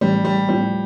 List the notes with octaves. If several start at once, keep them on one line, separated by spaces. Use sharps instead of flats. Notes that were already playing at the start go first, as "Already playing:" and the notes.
A1 G3
G3
A2 F3 G3